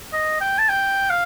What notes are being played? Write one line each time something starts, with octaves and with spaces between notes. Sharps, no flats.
D#5
G5
A5
G5
F5